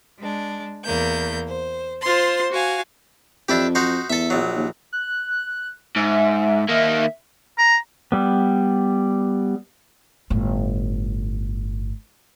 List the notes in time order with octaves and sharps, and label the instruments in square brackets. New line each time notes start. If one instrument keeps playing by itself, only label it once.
[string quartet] G#3 D4
E2 A#3 G6
C5
F4 C5 C6
F#4 F5 G#5
[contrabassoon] F2 [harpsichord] D4 E4 G4
[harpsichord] D#4 F#4 C5
[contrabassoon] E2 [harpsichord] A4 E5
[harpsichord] A#1 F#3
[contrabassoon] D#2
[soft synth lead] F#6
[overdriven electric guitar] G#2 [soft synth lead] E5
[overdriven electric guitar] D#3 A#3
[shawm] A#5
[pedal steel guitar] G3 B3
[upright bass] G1 A2